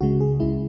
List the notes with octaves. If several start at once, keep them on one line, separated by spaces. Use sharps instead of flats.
C#2 C#3 G#3 F#4
G#4
C#2 C#3 G#3 E4